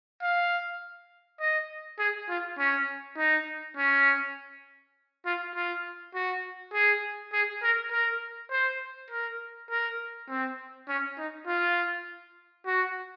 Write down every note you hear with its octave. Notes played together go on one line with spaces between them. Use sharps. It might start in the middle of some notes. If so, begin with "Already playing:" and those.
F5
D#5
G#4
F4
C#4
D#4
C#4
F4
F4
F#4
G#4
G#4
A#4
A#4
C5
A#4
A#4
C4
C#4
D#4
F4
F#4